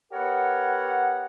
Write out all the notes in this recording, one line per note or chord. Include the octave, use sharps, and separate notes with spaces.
B3 G4 A#4 C#5 F#5